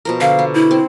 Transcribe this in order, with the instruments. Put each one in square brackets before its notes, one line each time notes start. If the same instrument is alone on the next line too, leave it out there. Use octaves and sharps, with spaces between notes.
[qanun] B2 F3 A#4
[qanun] D3 [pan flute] F5
[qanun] B3
[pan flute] E4
[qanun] C4